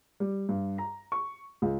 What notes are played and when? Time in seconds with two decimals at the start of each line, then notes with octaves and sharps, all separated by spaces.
0.20 G3
0.49 G2
0.78 A#5
1.12 C#6
1.62 C#2